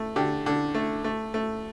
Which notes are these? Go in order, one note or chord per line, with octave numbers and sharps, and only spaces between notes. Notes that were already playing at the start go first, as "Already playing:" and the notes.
Already playing: A3
D3 G4
D3
A3
A3
A3